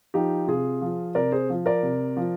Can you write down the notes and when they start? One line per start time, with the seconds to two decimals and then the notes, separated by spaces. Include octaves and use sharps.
0.14 F3 D#4 G4
0.48 C3 F4 G#4
0.81 F3
1.15 C3 A#4 D5
1.32 G#4 C5
1.50 F3
1.66 A#4 D5
1.83 C3
2.17 F3